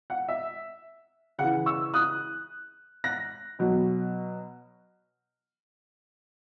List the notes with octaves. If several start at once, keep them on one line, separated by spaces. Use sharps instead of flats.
F#5
E5
C#3 E3 F#5
C#6 E6
D#6 F#6
F#6 A#6
B2 F#3